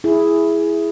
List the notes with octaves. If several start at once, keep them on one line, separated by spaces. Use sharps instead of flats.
E4 G#4